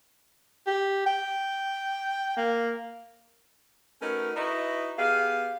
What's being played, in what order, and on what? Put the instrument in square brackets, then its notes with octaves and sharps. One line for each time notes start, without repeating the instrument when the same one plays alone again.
[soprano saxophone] G4
G5
A#3
[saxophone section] A3 C#4 D#4 F#4 A#4 B4
D#4 E4 F#4 B4 D#5
B3 G4 G#4 F5